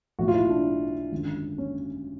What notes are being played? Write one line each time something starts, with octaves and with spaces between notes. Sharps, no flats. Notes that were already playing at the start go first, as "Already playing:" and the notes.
B1 A2 E3 F#4
F4
E4
D4
G#1 F#2 D3
C#4